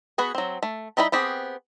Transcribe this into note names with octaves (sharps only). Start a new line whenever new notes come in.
B3 F#4 G#4 B4
F#3 C4
A3
G3 D#4 E4 A#4 B5
B3 C4 G4 G#4